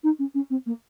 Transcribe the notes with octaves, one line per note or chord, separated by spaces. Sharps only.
D#4
C#4
C#4
C4
A#3